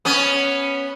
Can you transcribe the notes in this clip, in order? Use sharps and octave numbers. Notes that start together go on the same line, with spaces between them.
B3 C#4